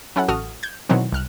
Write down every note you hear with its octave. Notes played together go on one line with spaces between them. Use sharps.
F#3 C#4 E4 A4 F#5
A1 F#4 A4 D#6 F6
G6 G#6
B2 D#3 E3 F#3 C4
C2 F6 F#6